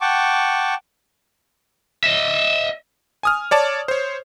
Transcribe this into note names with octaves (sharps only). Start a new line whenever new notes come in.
F#5 G5 A5 C#6 D6
D#5 E5
G#5 D#6 F6
C#5 D5 A5
C5 C#5